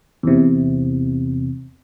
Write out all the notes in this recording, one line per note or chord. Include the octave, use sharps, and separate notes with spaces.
E2 C3